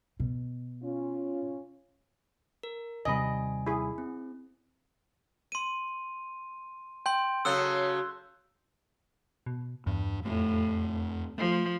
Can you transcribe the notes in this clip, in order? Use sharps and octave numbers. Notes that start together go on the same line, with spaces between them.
B2
C#4 F4
A#4
D#2 C3 G3 D#5 G#5 B5
E4 G#4
C4
C6 D#7
G5 C6 G6
C#3 F#3 A4 D#6 E6 F#6 G7
B2
E2 G2
F2 A2 A3
F3 A3